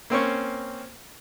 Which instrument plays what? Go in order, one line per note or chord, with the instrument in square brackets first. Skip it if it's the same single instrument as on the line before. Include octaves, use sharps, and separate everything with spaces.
[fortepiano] A#3 C4 C#4 C#6